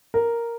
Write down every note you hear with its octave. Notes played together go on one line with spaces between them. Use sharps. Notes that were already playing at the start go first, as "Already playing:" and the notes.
A#4